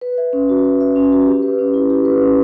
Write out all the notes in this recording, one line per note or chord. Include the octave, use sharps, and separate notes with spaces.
B4
E5
C#4
F#4
B4
E5
C#4
F#4
G4
B4
C#4
E4
G4
B4
C#4